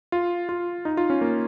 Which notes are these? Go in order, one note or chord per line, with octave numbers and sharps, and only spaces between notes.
F4
F4
D#4
F4
C#4
A#3